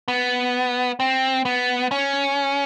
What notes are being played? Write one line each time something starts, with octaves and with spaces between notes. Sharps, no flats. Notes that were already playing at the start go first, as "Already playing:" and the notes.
B3
C4
B3
C#4